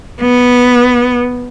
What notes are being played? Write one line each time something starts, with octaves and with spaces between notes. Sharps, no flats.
B3